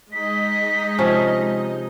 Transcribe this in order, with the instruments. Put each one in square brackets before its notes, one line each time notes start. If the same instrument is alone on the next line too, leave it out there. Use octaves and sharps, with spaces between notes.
[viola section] G#3 D#4 D#5 [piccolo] B6
[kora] C3 F3 C#4